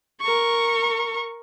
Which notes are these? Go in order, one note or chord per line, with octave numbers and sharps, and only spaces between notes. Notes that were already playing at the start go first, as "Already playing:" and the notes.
A#4 C#6